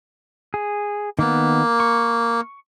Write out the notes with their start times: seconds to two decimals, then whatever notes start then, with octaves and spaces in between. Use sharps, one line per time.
0.54 G#4
1.19 D#3 A#3 B3
1.80 C#6